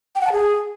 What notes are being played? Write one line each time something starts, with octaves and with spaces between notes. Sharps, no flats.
G5
F#5
A5
G#4